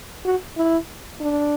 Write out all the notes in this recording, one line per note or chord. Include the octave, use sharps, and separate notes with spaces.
F#4
E4
D4